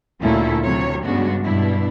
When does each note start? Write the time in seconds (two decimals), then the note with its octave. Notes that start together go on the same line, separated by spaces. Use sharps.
0.21 D2 A#2 A3 C#4 E4 A4
0.63 D2 C3 F#3 C#5
1.05 G2 C#3 G#3 B3 D4 F#4
1.44 G2 B2 D4 E4